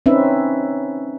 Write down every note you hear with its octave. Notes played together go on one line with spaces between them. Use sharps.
C4 C#4 D#4 B4 E5